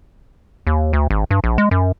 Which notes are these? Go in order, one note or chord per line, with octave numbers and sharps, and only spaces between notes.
D#2
D2
G#1
G2
A#1
G#3
F#2